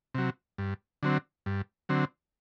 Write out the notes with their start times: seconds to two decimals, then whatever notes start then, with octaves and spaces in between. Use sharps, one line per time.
0.15 C3 F#3
0.58 G2
1.03 D3 F#3 C4
1.46 G2
1.89 D3 F#3 C4